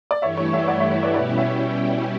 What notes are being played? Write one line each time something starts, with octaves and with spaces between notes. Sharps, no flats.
D5
G2 E3 A3 E4 G4 C#5 E5
C#5
C#5 E5
D5 F#5
C#5 E5
C#5
B4 D5
B2 G3 C#4 E4 G4 B4 D5
C#5 E5